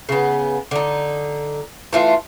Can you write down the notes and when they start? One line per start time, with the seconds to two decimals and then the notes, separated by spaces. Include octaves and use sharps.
0.09 C#3 B3
0.71 D3 D#4
1.93 E3 A3 F4